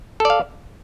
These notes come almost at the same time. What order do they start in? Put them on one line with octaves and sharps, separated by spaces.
A4 D5 F5